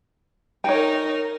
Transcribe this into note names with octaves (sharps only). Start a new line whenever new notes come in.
D#4 A#4 C#5 G5